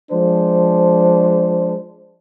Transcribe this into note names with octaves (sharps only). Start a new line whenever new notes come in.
F3 G#3 D4 C5